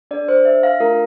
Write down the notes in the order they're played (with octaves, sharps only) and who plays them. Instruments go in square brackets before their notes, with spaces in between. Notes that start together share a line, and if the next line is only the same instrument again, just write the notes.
[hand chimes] D4 A4 D5
C5
E5
F5
A3 D4 F4 A4 A#4